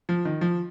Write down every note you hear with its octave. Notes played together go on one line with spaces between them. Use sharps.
F3
D#3
F3